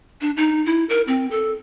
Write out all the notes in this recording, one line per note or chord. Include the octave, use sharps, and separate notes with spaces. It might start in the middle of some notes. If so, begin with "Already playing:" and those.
D4
D#4
E4
A#4
C4
A4